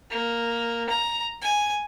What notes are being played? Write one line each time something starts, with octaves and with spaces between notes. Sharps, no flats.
A#3
A#5
G#5